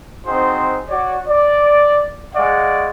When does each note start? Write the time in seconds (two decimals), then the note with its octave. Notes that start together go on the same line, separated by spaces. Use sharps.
0.25 C4 D#4 F#4 G#4 C5
0.89 F#4 C#5 D5
1.28 D5
2.34 G#3 D5 F5 F#5 C#6